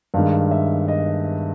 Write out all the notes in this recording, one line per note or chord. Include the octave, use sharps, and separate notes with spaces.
G2 D#3 G#3 F5
E5
D#5